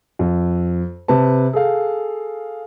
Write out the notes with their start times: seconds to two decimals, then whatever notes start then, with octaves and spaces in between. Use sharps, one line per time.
0.19 F2
1.08 C3 B4 A5
1.53 G#4 A4 F5